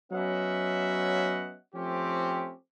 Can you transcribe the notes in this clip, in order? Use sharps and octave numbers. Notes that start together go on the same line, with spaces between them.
F#3 B3 C#4 D#5 E5 F#5
F3 A3 C4 C#4 G4